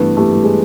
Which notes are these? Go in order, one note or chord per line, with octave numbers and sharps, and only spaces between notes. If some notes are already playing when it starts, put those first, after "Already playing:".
Already playing: G2 E3 A3 B3
G3 A3
G3
G#3